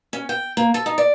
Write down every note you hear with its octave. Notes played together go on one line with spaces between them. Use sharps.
C#4
G5
A#3
A4
D#4
D5